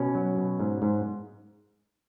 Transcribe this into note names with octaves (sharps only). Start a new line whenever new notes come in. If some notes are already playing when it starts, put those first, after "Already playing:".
Already playing: B2 C#4
F#3
B2
G#2
G#2